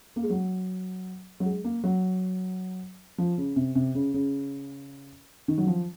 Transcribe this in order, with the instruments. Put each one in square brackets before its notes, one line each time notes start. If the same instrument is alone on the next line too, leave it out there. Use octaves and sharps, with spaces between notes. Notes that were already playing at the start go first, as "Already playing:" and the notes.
[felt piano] A#3
G#3
F#3
F#3
G#3
A#3
F#3
F3
C#3
C3
C3
C#3
C#3
D#3
F#3
F3